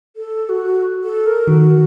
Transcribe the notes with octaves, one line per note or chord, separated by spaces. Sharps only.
A4
F#4
A4
A#4
D#3 F#4